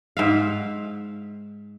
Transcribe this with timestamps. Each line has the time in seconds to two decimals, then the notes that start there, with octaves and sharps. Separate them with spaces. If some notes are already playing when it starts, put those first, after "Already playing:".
0.17 G#2 E5 F5